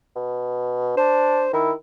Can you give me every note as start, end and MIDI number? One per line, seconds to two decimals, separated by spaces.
0.16 0.96 47
0.97 1.46 62
0.97 1.49 72
1.53 1.72 51
1.53 1.71 64